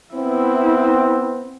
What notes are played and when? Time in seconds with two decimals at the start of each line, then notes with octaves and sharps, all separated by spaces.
0.14 B3 C4 E4